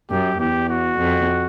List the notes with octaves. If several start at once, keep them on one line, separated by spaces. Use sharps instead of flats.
F#2 G4
E2 G4
F#4
F2